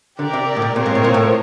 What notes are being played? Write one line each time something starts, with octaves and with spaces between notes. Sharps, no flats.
D3 G4 A#4 D5
C3
A2
A#2
A#2 C4 F4 A#4 C#5
G#2
A2
A#2
A2